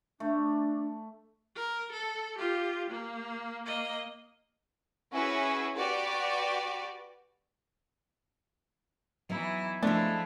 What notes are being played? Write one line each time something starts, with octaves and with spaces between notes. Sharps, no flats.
A3 D4
A#4
A4
F4 G4
A#3
A#3 D#5
C#4 E4 F#4 G#4 B4
F#4 G4 B4 D5
E3 F#3 B3 D#4 E4
F3 G#3 A3 D4 E4